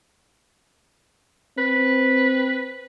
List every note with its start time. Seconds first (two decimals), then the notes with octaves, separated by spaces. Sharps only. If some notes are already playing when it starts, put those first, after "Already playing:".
1.58 C4 B4